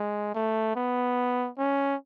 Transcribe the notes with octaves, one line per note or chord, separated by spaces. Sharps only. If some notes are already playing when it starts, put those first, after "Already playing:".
Already playing: G#3
A3
B3
C#4